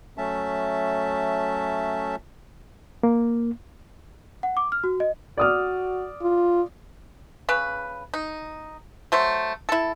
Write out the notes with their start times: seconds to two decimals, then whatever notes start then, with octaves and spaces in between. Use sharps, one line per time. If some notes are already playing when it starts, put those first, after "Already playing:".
0.18 F#3 A3 C#4 E5 A5
3.03 A#3
4.43 F#5
4.57 D6
4.72 F6
4.84 F#4
5.00 D#5
5.38 F#4 D5 D#6 F6
6.22 F4
7.49 C#3 B4
8.14 D#4
9.12 F#3 A3 C5
9.69 E4 A4